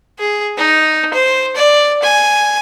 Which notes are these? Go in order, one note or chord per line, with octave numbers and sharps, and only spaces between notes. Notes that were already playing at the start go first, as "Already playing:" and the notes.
G#4
D#4
C5
D5
G#5